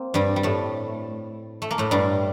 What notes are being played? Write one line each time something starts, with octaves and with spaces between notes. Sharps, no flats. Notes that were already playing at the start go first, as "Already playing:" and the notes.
Already playing: A#3 C4
G2 G3
G3
A2 A3
A3
A#3
A2 A3
G2 G3